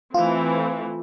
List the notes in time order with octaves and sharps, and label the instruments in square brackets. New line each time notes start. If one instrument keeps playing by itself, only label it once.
[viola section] E3 A3 C4 [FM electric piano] F4